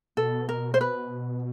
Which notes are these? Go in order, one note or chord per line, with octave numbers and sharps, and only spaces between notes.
B2 A4
A#4
C5
B4